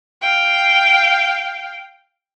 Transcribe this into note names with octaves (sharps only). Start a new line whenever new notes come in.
F5 G5